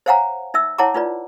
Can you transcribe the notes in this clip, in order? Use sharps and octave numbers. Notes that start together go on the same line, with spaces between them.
C5 C#5 F5 F#5 G#5 A#5
D#4 E5 E6
E4 C#5 F#5 A5 A#5 D6
D#4 F4 B4 D5